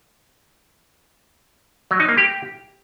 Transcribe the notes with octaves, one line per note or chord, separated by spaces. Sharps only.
F#3
D#4
A#3
G4